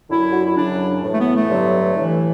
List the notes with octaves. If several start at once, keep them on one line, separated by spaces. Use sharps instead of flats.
F#2 D3 F#3 E4
F#4
E4
F#2 C#3 F#3 D4
A2 E3
A3
B3
A3
G2 D3 F#3
A2 E3